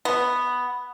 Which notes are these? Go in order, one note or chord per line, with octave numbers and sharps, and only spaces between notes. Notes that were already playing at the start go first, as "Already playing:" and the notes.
B3